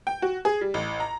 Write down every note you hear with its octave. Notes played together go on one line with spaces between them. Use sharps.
G5
F#4
G#4
G3
A1
A#5